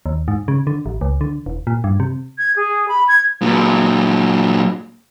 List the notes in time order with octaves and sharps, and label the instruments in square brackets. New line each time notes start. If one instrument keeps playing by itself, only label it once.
[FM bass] D#2
G#2
C#3
D3
A1
C#2
D3
E1
A#2
G2
C3
[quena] G#6
G#4
B5
G#6
[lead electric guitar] A#2 F#3